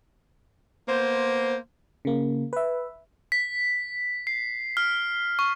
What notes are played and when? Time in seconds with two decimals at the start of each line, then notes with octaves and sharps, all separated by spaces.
0.89 A#3 B3 C5
2.05 C#3 A#3
2.53 B4 E5
3.32 B6
4.27 C7
4.77 F6
5.39 C#6